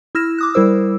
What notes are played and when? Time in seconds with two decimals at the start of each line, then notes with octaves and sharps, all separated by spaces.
0.15 E4 E6 F6 A#6 E7
0.38 D6 D#6 F#6
0.54 G3 E4 A#4 C5 E6